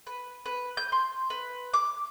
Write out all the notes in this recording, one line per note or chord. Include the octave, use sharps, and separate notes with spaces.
B4
B4
G6
C6
B4
D6